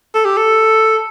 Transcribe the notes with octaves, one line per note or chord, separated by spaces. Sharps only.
A4
G4
A4